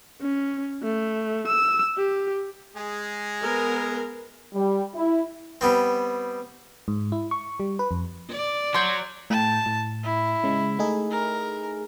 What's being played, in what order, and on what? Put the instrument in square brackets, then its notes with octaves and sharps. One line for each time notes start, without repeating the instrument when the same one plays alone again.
[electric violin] C#4
A3
E6
G4
[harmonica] G#3 G#4
[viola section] B3 A#4
[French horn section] G3
E4
[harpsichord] G3 B3 C4
[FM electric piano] G#2
E4
C#6
G3
B4
F2
[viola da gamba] D5
[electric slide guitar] F#3 C#5 [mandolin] C6 G6
[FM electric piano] A2 G5 [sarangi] A5
[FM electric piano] A2
[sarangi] E4
[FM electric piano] C#3 G#3
A3 D#4 G#4
[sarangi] A#4